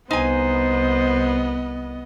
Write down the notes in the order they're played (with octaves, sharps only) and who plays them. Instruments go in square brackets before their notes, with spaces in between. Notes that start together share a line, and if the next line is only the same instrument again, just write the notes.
[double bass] C2 [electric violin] B3 D#5 [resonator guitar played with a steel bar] D#4 G#5 [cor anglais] C5